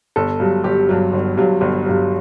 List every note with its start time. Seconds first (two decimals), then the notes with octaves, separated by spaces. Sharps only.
0.16 G1 A4
0.40 G2 F#3
0.64 G1 G4
0.89 G2 F#3
1.13 G1
1.37 G2 F#3
1.61 G1
1.86 G2 F#3